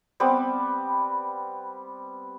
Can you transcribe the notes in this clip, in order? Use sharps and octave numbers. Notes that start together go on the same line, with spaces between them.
G3 B3 C4 D6